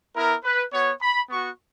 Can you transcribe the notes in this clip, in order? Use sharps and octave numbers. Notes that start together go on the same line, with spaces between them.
B3 E4 A#4
B4
B3 F#4 C#5
B5
B3 F#4 C#6